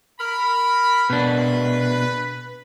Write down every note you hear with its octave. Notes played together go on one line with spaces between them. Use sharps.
A#4 B5
B2 D4 B4